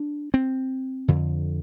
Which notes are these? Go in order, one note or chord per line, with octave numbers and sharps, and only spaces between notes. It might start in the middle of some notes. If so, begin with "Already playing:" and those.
Already playing: D4
C4
F2 D3